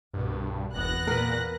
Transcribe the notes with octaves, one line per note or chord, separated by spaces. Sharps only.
C2 G2 B2
F#1 E2 B3 F#6 A#6
A#2 A#4 B4